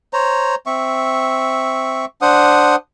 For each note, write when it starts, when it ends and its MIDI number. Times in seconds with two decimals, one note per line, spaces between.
0.13 0.55 72
0.13 0.55 73
0.13 0.55 82
0.66 2.05 60
0.66 2.05 76
0.66 2.05 85
2.22 2.76 62
2.22 2.76 72
2.22 2.76 78
2.22 2.76 87